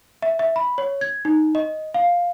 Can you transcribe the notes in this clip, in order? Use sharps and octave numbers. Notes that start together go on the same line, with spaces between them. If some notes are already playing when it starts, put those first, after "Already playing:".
E5
E5
B5
C#5
G#6
D#4
D#5
F5